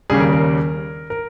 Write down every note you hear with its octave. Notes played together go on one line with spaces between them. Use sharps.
D#2 C#3 G3 G#4
A#4
A#4
A#4